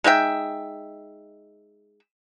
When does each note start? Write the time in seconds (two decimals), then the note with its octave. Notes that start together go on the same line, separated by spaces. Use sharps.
0.04 G#3 D#4 E5 G5